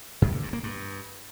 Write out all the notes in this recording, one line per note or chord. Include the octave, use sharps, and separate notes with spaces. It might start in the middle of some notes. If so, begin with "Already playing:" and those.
F#2
D3
G2
A#3
G2